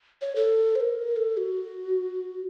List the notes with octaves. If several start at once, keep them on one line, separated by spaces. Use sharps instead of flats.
C#5
A4
C5
A#4
A4
F#4